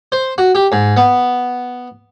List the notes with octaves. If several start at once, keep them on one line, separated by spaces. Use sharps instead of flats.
C5
F#4
G4
G#2
B3